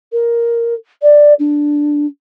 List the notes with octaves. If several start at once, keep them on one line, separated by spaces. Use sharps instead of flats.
A#4
D5
D4